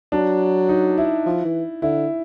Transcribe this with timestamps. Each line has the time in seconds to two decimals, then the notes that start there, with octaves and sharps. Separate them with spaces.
0.12 F#3 D4
0.69 D#4
0.98 E4
1.26 F3
1.45 E3
1.82 D3 E4